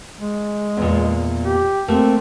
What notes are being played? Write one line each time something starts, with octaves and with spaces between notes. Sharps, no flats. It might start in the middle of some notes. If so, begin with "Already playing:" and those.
G#3
E2 A#2
G4
A3 A#3 C4